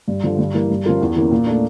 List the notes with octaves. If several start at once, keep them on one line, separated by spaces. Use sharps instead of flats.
G2
D3 F3
G2
E3 G3 A#3
G2
F3 C#4 F4 A#4
E2
E3 A#3 C#4
A#2
A3 D4